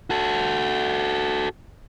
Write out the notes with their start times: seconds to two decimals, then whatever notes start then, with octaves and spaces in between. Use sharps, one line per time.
0.10 F#4 A4